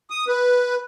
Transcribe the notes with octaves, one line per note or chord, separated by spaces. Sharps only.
D#6
B4